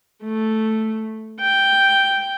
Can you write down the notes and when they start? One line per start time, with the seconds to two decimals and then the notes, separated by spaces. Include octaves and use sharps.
0.23 A3
1.41 G5